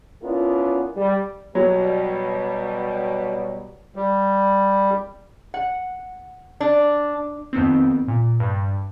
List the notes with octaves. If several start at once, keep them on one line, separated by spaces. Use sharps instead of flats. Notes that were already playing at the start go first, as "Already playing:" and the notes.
B3 C#4 D4 E4 F4 A#4
G3
B2 F#3 G3
G3
F#5
D4
F2 D#3 B3 C4
A#2
G2